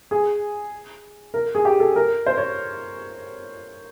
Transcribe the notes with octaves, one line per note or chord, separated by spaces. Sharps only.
G#4
A#4
G#4
G4
A4
A#4
C5
C#5